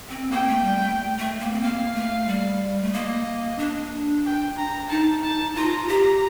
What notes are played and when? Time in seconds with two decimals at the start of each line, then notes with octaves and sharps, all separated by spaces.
0.09 C4
0.31 A#3 G5
0.48 A3
0.64 G3
0.80 A3
1.18 A3
1.40 A#3
1.53 C4
1.61 A#3 F5
1.95 A3
2.27 G3
2.83 A3
2.93 A#3 D#5
3.58 D4
4.25 G5
4.57 A#5
4.89 D#4 A5
5.23 A5
5.55 F4 A#5
5.88 G4